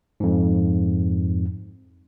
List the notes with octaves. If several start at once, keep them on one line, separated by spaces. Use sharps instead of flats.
F2 G#2